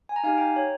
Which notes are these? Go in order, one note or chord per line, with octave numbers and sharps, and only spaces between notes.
G#5
A#5
D#4 G4 F5 G#5
G5 A#5
C#5